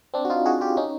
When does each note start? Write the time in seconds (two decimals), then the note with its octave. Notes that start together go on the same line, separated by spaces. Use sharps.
0.14 C4 D4
0.25 F#4
0.30 D#4 F4
0.46 F#4 G#4
0.61 F4 G4
0.77 C#4 D#4